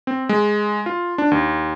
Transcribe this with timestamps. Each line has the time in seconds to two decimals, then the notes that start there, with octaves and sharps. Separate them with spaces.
0.07 C4
0.29 G#3
0.86 F4
1.18 D4
1.31 D#2